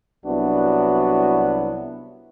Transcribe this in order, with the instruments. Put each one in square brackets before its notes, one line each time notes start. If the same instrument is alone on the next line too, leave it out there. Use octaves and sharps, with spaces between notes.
[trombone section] C2 F#3 B3 D4 E4 F#4